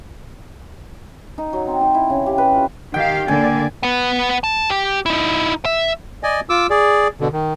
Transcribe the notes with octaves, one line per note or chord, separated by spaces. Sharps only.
D#4
F#3
C4
D#4
E4
C#3
G4
B4
F4
D#3 G4 F5 G5
D3 A#3 D5 G#5
B3 B4
A5
G4
D#4 E4
E5
D5 D#5 G#5
F4 D6 E6
G#4 D5
B2 D3
D#3